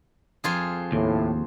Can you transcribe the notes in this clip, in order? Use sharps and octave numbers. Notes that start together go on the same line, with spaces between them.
F2 F4 G#4
D#2 A2